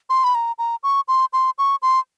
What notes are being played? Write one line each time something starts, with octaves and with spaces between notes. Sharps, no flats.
C6
B5
A#5
A#5
C#6
C6
C6
C#6
C6